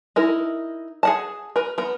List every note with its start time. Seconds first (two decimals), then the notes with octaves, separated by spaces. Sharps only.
0.16 D#4 E4 A#4
1.03 G#4 F#5 A5
1.56 A#4 B4
1.78 B3 A#4